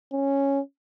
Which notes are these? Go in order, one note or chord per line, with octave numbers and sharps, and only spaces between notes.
C#4